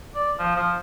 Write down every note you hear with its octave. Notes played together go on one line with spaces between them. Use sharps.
D5
F3
F3